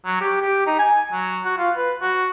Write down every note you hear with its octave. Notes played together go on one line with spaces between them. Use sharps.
F#3
G4
G4
D#4
G#5
F#3
F#4
F4
B4
F#4